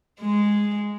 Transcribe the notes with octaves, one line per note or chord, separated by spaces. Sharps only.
G#3